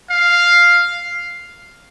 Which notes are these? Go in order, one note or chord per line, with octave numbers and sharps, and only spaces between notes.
F5